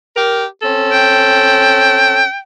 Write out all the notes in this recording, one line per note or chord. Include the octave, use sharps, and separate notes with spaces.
G4 A#4
C4 C#4 A4
G5